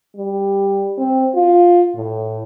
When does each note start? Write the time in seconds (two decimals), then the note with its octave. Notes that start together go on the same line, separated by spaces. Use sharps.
0.16 G3
0.98 C4
1.35 F4
1.95 A2